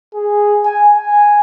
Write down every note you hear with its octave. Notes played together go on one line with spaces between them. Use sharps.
G#4
G#5
G#5